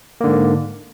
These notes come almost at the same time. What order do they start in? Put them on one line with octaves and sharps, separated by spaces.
A#3 D3 G#2